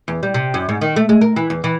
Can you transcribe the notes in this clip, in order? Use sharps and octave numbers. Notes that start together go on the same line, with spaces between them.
E2
G3
C3
F#2
G#2
D#3
A3
G#3
A#4
E3
E2
E3